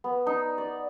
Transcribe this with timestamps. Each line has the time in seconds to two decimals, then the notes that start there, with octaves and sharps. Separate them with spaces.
0.04 B3
0.27 D#4
0.58 D5